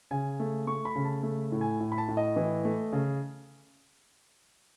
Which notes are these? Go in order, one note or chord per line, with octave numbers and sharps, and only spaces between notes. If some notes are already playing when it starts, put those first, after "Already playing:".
C#3 G#5
A3
A3 C#6
B5
C#3
A5
A3
A2
G#5
A2
B5
A5
A2
D#5
E3
A3
C#3